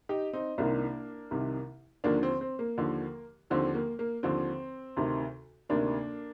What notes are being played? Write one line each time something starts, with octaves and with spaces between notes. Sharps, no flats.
D#4 G4
C4 D#4
C2 C3 D#3 A#3 D4
C2 C3 D#3
D#2 D3 F3 A#3 D4
C4
C4
A#3
D#2 D3 F3
D#2 D3 F3 C4
A#3
A#3
D#2 D3 F3 C4
D2 C3 D#3
D2 C3 D#3 A#3 D4